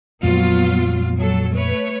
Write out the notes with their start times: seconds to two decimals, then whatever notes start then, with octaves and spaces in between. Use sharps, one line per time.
0.23 F2 A#2 F#3 G#3 B3 F4
1.20 F#3 A4
1.56 A3 B4 C#5